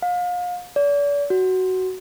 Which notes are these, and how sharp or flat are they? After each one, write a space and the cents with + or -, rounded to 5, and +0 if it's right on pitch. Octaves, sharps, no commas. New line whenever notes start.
F5 +35
D5 -40
F#4 +10